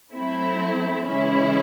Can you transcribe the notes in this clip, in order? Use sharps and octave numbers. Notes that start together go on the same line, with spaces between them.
F#3 A3 C4 E4
C#3 E3 G#3 C#4 E4